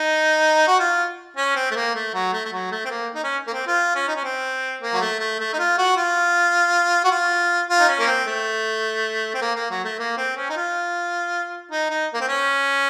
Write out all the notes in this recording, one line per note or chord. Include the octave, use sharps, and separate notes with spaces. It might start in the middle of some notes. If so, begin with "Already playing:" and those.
Already playing: D#4
F#4
F4
C#4
C4
A3
A#3
A3
F#3
A3
A3
F#3
A3
C4
A#3
D#4
C#4
A#3
C4
F4
C#4
D#4
C#4
C4
A#3
F#3
A3
A3
A3
D#4
F4
F#4
F4
F#4
F4
F4
D#4
C#4
A#3
C4
A3
C4
A#3
A#3
F#3
A3
A#3
C4
C#4
D#4
F4
D#4
D#4
A#3
C4
C#4